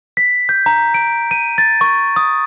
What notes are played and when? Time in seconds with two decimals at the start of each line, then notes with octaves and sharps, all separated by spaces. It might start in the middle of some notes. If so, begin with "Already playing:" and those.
0.17 B6
0.49 G6
0.66 A#5
0.94 D7
1.31 D#7
1.58 A6
1.81 C#6
2.16 D#6